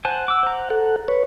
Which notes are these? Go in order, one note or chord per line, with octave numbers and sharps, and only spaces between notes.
C5 F#5 G#5 A5
D6 E6
C5 A#5
A4 F#5
B4 C#5